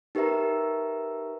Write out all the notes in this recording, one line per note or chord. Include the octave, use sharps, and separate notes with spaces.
D#4 G4 A#4 B4 E5 A#5